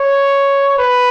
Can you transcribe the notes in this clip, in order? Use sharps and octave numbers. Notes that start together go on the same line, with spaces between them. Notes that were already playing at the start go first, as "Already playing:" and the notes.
Already playing: C#5
B4